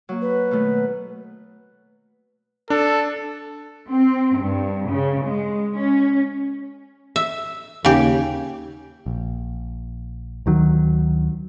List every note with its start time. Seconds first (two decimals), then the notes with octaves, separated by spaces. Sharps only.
0.09 F#3 A#3
0.21 B4
0.51 B2 D#3 A3
2.70 D4 A4
3.88 C4
4.37 G2
4.89 C#3
5.25 G#3
5.75 C#4
7.16 E5
7.85 D#2 C#3 G4
9.06 A#1
10.46 D2 D#3 F#3